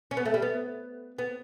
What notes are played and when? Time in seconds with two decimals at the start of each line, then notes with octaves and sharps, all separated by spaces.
0.11 C#4
0.17 B3
0.25 A3
0.34 G3
0.42 B3
1.19 B3